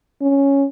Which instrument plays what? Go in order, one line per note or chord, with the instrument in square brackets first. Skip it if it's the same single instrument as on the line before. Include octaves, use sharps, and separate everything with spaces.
[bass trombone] C#4